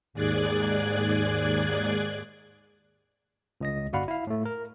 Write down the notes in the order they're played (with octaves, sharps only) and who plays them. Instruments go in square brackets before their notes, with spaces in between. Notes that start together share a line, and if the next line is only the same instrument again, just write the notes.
[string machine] D#2 G#2 G#4 D5 F#6 G#6
[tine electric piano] C#2 D#5 A#6
G1 F#4 D5 F5 F#5 B5
E4 F5
A2 A3
A#4